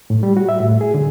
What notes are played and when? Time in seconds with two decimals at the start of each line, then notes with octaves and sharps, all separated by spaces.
0.10 A2
0.23 G3
0.37 F#4
0.49 E5
0.60 A2
0.81 G#4
0.94 D3